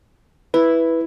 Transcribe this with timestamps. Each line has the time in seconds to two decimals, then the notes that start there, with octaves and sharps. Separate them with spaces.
0.54 E4 B4